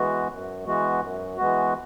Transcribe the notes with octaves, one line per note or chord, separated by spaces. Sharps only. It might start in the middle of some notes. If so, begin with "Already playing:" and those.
Already playing: E3 G#3 B3 F#4
F#2
E3 G#3 B3 F#4
F#2
E3 G#3 B3 F#4